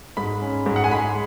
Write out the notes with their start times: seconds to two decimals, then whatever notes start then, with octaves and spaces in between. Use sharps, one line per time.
0.17 G#2 B5
0.42 C#4
0.66 G#2
0.76 F#5
0.84 G#5
0.90 G#3 B5